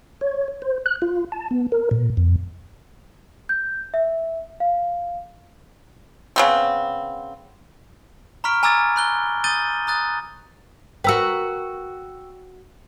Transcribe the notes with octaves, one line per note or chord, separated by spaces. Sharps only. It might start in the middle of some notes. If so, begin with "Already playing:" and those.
C#5
C5
F#6
F4
A5
B3
A#4
A#2
F2
G6
E5
F5
C#3 B3 C4
A#5 B5 C#6 F6 B6 D7
G#5 A#5 D6 E6 G#6 A6
B5 F#6 G7
D#6 G6 A6 D#7 G7
A#5 D#6 F#6 A6
F#4 A#4 B4 G5 E6